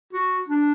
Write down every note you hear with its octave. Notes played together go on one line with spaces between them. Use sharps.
F#4
D4